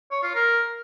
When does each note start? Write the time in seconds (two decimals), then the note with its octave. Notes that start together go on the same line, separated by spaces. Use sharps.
0.11 C#5
0.23 F4
0.35 A#4